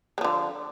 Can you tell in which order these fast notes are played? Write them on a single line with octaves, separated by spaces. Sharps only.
G#3 F3 D3